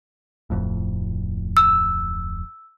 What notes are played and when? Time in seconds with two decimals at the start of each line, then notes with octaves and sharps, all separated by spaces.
0.50 D1 F2 A2
1.57 E6